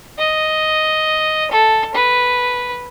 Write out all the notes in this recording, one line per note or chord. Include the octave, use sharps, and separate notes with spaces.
D#5
A4
B4